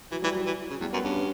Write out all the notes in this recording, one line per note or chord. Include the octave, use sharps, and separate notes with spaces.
E3 F#3
E3 G3
F#3
E3
C#3
E2 G3
F#2 B3
G2 C#4
C#4